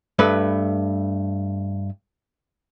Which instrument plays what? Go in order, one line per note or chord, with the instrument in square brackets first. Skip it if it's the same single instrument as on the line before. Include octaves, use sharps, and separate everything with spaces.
[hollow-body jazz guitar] G2 A3 B4